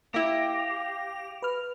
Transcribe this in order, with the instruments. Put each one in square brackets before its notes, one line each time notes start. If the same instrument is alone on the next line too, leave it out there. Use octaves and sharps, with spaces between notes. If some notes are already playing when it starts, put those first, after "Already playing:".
[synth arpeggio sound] A#3 E4 [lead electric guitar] G4 [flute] F5 [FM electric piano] A#6
[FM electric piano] B4 F6